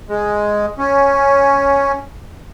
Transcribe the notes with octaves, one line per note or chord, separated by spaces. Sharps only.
G#3
C#4